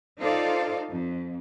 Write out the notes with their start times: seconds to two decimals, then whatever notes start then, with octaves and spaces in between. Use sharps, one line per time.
0.20 D#4 F4 A4 C5 D5 F5
0.89 F2